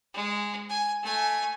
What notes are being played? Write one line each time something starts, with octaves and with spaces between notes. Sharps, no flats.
G#3
G#5
A3 G#5